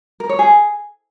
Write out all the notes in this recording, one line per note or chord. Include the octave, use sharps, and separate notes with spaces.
A#4
C#5
G#4